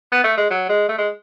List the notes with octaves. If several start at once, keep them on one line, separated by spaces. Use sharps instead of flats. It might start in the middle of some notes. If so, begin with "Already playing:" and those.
B3
A3
G#3
F#3
G#3
A3
G#3